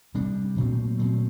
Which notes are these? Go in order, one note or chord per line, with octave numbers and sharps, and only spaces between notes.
C3 G3 D4
A#2 F#3 A3 C4
A#2 F#3 A3 C4